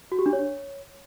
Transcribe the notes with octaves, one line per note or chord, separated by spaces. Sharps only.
F#4
G4
D4
C#5